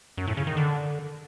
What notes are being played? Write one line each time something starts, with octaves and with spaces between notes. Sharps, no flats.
F#2
A2
C#3
D#3
D3